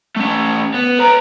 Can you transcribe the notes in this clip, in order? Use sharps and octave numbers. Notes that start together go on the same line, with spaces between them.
A3 C#4
B3
B4 A#5